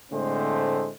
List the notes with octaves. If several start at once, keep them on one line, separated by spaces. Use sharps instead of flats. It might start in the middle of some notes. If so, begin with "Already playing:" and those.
A2 D3 G#3 A3 C4 C5